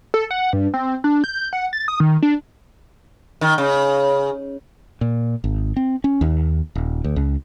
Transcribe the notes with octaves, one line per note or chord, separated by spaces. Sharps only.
A4
F#5
G2
C4
D4
G6
F#5
A6
D#6
D#3
D4
D#3
C#3
A#2
G#1
C4
C#4
D#2
D#1
D2
C#2